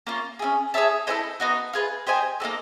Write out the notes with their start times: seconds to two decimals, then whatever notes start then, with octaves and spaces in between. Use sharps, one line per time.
0.07 A#3 C#4 F4
0.39 C#4 E4 G#4
0.74 G#4 C#5 E5 A5
1.07 E4 A4 C5 D#5
1.40 B3 D#4 F#4
1.73 F4 G#4 B4
2.07 G4 C5 D#5 G#5
2.40 A#3 D#4 F#4 A4